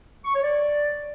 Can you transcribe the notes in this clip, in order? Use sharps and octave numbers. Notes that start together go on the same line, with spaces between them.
C#6
C#5
D5